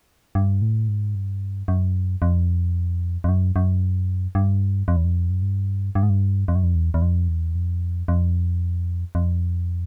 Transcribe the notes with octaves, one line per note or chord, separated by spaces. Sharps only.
G2
A2
G#2
G2
F#2
F2
F2
F#2
F#2
G2
F2
E2
F2
F#2
G2
G2
G#2
G2
F2
F#2
F2
E2
E2
F2
E2
F2
F2
F2